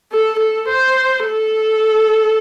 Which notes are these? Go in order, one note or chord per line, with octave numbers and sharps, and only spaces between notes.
A4
A4
C5
A4